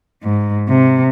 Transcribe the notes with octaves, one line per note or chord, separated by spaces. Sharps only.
G#2
C3